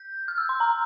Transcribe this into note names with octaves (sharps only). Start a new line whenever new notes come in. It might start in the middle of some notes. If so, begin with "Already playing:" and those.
Already playing: G6
F6
E6
C6
A#5